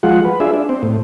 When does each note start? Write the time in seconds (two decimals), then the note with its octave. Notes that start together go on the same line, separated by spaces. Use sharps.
0.03 F3 G#3 F4 F#5
0.25 B4
0.40 D4 F4 G#4 E5
0.54 D4
0.69 C4
0.83 A2